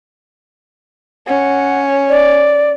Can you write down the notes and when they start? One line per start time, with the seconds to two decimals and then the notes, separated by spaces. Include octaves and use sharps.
1.28 C#4 F#5
2.09 D5